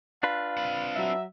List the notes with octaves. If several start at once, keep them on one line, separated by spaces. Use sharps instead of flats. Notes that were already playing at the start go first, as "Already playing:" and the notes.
D4 F4 B4 F5
C4 B5
F#3 E5